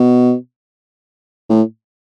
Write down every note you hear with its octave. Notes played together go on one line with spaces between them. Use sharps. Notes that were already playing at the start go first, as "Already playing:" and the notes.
Already playing: B2
A2